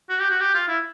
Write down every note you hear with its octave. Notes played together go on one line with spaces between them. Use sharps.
F#4
G4
F#4
G4
F4
E4